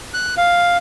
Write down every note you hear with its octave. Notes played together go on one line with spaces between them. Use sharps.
F#6
F5